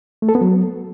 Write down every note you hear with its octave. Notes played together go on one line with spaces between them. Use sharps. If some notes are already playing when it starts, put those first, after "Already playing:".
A3
A4
B3
F#3